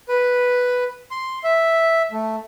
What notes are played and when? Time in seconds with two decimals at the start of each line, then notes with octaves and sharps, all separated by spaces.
0.09 B4
1.11 C6
1.44 E5
2.12 A3